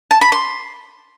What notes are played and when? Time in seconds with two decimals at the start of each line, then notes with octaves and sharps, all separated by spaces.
0.11 A5
0.21 B5
0.32 C6